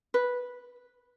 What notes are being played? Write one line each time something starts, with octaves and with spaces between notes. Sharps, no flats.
B4